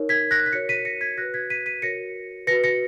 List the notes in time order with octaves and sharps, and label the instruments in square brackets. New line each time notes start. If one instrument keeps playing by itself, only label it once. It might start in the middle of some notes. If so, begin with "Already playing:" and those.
Already playing: [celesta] D#4 A#4 C#5
G#6 B6
F#6 A#6
B6
F#4 A#4 C#5 A#6 C#7
B6 D#7
A#6 C#7
G#6 B6
F#4 B4 F#6 A#6
G#6 B6
B6 D#7
B6 D#7
F#4 A#4 C#5 A#6 C#7
F#4 B4 A#6 C#7
A#6 C#7